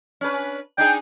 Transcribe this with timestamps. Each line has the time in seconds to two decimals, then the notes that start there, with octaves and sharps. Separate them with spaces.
0.21 C#4 D4 B4
0.78 D4 D#4 G#4 G5